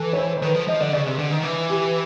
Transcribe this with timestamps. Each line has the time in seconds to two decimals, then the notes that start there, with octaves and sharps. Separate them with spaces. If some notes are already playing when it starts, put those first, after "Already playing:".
Already playing: E3 A4
0.13 C#5
0.18 C5
0.37 C5
0.42 D#3 B4
0.55 F3
0.68 F3 D#5
0.80 D3 D5
0.93 C#3 D5
1.06 C3
1.19 D3
1.31 D#3
1.43 E3
1.70 G4